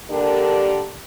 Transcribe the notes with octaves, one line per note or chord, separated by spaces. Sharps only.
D3 G3 A#3 D4 G4 A#4